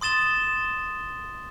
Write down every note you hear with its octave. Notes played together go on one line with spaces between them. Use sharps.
C6 D#6 A6 E7 G7